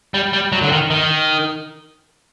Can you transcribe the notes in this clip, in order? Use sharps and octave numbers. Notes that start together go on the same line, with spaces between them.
G3
G3
F#3
D3
D#3
D#3